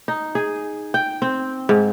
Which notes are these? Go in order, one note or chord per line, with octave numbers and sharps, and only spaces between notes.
D#4
G#4
G5
C4
G#2